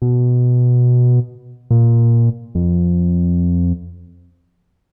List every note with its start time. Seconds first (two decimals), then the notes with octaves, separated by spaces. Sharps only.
0.02 B2
1.70 A#2
2.55 F2